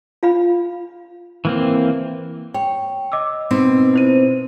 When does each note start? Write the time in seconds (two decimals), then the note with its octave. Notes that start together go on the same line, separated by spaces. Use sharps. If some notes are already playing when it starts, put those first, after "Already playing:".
0.23 F4 F5 B5
1.45 E3 A#3 C4
2.54 C#5 G5
3.12 D#5 D6 E6
3.51 B2 C4 D#4
3.94 E4 C5 D#7